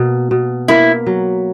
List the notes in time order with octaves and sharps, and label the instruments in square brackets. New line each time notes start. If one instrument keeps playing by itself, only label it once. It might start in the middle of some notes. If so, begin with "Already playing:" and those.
Already playing: [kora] B2 A#3
B2
[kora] A#3 [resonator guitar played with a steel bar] E4
[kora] F#3